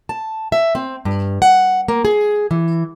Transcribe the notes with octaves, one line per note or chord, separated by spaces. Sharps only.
A5
E5
C4
G2
F#5
A#3
G#4
E3